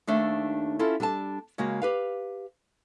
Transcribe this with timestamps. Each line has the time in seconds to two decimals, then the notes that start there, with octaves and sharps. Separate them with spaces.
0.07 D#2 A3 D4 D#4
0.79 C#4 E4 F4 A4
1.00 G3 D4 A4 G5 A5
1.58 C#3 G#3 A#3 F#4
1.82 G4 B4 F5